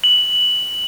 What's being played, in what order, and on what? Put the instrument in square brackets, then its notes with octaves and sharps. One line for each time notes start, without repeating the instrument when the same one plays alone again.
[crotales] F#7